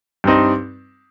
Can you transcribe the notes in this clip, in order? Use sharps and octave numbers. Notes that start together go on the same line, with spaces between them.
G2 G3 C4 D#4